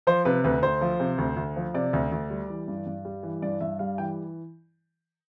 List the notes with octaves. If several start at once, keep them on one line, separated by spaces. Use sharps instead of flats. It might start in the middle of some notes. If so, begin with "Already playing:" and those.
F3 C5
C3 B4
D2 B4
D2 C5
F3
C3
D2
D2
F3
C3 D5
D2
D2
G3
E3
G2
G2
G3
E3
G2 D5
G2 E5
G3 F5
E3 G5